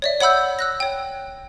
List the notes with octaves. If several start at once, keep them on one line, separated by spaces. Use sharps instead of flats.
C#5 D5 E5
C#5 F#5 B5 E6 G6
E6 F#6 A#6
C#5 G5